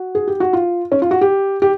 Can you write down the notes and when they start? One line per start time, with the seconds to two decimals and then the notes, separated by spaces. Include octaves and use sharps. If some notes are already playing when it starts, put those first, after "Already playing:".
Already playing: F#4
0.15 G#4
0.28 G4
0.40 F#4
0.53 F4
0.92 C#4
1.02 F4
1.11 F#4
1.21 G4
1.62 G4